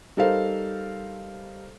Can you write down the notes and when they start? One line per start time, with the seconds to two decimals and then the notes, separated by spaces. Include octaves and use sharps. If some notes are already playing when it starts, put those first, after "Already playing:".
0.17 G3 D#4 A4 A#4 C5 F5